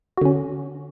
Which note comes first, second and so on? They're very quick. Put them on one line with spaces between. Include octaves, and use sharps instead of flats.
F#4 D3 C#4